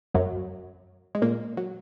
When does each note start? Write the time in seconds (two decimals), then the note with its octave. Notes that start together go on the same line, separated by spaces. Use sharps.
0.14 F#2 F#3
1.15 G#3
1.22 A#2 A#3
1.57 F#3